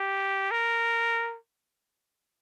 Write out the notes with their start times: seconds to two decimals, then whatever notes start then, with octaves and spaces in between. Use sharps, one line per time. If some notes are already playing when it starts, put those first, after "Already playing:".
Already playing: G4
0.51 A#4